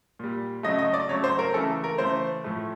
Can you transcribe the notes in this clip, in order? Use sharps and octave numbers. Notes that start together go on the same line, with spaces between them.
A#2 G3
C#3 F#3 A3 D#5
D#5
D5
C#3 F#3 A3 C#5
C5
A#4
C#3 E3 A3 A4
A#4
C#3 E3 A3 C5
A2 F3 A3